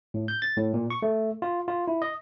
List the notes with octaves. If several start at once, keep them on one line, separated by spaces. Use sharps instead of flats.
A2
G6
A6
A2
A#2
C#6
A3
F4
F4
E4
D#5